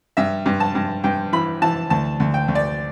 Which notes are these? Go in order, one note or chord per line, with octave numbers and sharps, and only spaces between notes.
G2 E5
G2
A5
G2
G2 G5
E3 B5
E3 A5
D2 A5
D2
G5
D2
D5